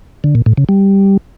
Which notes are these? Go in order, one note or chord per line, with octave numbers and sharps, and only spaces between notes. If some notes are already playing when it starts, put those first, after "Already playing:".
D3
A#2
A2
C#3
G3